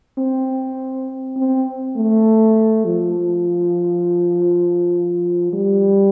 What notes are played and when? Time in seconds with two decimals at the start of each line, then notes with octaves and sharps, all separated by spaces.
0.18 C4
1.37 C4
1.96 A3
2.85 F3
5.53 G3